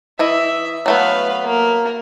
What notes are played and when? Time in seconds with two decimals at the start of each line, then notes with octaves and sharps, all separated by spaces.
0.19 E3 E4 D#5 E5
0.86 F#3 A3 B3 B4 F5
1.45 A#3 A#4